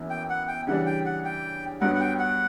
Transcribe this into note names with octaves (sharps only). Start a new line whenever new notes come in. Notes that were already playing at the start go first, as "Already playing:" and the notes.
Already playing: F#2 E3 B3
G5
F#5
G5
C#3 E3 G3 D4 F#5
G5
F#5
G5
G2 F#3 B3 F#5
F#5
G5
F#5